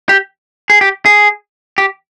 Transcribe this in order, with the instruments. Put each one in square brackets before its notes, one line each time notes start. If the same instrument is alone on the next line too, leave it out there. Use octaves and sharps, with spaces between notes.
[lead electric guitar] G4
G#4
G4
G#4
G4